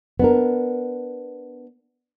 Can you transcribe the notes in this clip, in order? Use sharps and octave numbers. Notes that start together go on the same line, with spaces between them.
B3 D4 A#4